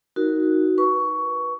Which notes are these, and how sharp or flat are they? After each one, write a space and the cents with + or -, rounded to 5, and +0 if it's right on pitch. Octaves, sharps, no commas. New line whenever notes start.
D#4 +15 F#4 +0 A#4 +0
B4 -15 C#6 +15